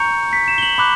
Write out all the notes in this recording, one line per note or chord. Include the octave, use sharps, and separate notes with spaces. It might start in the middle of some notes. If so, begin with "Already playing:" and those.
Already playing: A#5 C#6 G6 C#7
B6
E7
G7
F#7
B5 D6 F#6